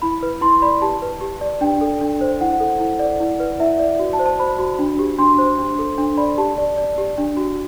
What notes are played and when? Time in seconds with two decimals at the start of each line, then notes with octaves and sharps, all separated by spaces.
0.02 E4 B5
0.23 B4
0.41 E4 C6
0.62 D5 B5
0.82 G4 A5
1.02 B4
1.21 G4
1.41 D5
1.61 D4 G5
1.81 A4
2.01 D4
2.21 C5
2.41 E4 F#5
2.60 A4
2.80 E4
2.99 D5
3.20 E4
3.40 B4
3.60 E4 E5
3.79 D5
3.99 F#4
4.13 A5
4.19 C5
4.26 A5
4.40 C5 B5
4.59 F#4
4.79 D4
4.99 G4
5.19 D4 C6
5.38 C5
5.58 D4
5.79 A4
5.98 D4
6.17 D5 B5
6.38 G4 A5
6.58 D5
6.78 D5
6.98 G4
7.18 D4
7.37 F#4